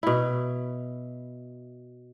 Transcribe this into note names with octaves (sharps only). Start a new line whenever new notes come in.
B2 E4